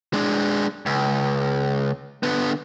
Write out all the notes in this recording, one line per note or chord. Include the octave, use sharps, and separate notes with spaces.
G#3 D4
C#2
D3 B3